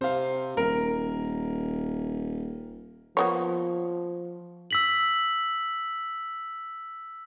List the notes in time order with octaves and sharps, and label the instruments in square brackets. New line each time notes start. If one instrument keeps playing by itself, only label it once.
[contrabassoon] C3 [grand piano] C5 F5
[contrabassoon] D#1 [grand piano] A#4
[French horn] F3 [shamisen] A#3 B3 C#5
[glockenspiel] E6 B6 F#7